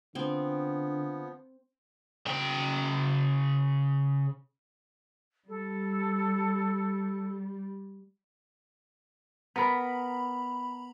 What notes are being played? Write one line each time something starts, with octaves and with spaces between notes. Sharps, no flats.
D3 F3 B3 C4
C#3 G5
G3 A4
B3 A#4 A#5 B5